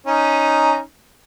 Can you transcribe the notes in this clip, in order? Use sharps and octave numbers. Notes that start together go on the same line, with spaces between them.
C#4 D#4